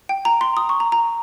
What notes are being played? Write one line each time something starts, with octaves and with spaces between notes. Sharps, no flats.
G5
A#5
C6
D#6
C#6
A#5
A#5